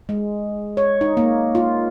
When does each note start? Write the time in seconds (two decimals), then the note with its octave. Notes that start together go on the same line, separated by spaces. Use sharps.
0.09 G#3
0.77 C#5
1.01 D#4
1.17 A#3
1.55 F4